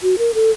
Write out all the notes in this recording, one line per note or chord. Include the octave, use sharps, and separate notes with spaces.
F#4
A#4
A4